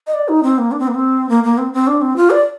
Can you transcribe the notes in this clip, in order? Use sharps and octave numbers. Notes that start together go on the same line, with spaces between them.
D#5
D5
D#4
C4
A#3
D4
C4
A#3
C4
A#3
A#3
C4
C4
D4
C4
F4
D5